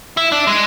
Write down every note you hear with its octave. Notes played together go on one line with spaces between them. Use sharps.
E4
D4
G#3